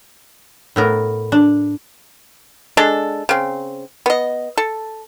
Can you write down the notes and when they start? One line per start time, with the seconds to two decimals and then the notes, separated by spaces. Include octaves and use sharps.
0.76 A2 B3 A#4
1.32 D4
2.77 G#3 D4 A4
3.29 C#3 C4
4.06 B3 D#5
4.58 A4